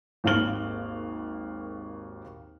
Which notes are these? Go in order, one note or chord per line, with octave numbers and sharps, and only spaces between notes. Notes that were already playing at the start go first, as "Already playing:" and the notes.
G#1 D#2 F5 F6 F#7